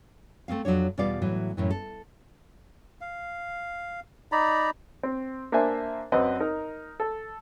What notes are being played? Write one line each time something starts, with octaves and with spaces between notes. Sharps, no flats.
A3 C4 C#4 F5
F2 F#3 A#3 D4 C#5
E2 B2 G3 F4 D5 F5
A2 E3 F#3
F#2 A2 E3
A4
F5
D#4 D5 A#5 B5
C4
A#3 D4 C5 E5 G#5
F#2 C4 B4 C5 D#5
D#4 A#4
A4